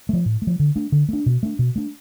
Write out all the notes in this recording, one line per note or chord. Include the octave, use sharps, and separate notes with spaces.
F3 A3
A2
A3
F3
D3
A3 D4
D3
A3 D4
B2
A3 D4
B2
A3 D4